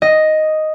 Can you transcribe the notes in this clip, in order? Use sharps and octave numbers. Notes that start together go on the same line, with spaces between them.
D#5